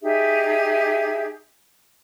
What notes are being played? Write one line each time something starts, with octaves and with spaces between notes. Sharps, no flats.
D#4 G4 G#4 E5